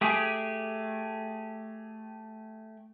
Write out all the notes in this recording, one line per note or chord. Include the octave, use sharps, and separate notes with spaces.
A3 G4 G#4